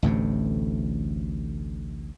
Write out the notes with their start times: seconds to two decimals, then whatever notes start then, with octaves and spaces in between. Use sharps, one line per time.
0.03 A1 D2 A2 C3